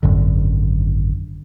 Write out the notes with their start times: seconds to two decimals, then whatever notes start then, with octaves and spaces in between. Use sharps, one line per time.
0.03 G#1 F#2 D3